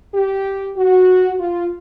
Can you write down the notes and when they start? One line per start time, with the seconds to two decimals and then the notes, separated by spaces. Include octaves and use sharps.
0.14 G4
0.77 F#4
1.39 F4